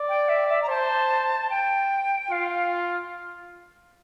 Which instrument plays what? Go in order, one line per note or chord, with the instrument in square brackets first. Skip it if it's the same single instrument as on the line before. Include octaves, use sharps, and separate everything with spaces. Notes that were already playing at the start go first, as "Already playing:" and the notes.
Already playing: [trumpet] D5
[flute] G5
E5
E5
A#5
[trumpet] C5 [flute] A5
[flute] G5
[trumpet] F4 [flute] F5
[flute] F5